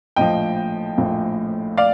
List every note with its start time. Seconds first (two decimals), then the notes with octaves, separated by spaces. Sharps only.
0.16 A#1 A2 F3 D#5 G5
0.98 A#1 A2 F3
1.77 D5 F5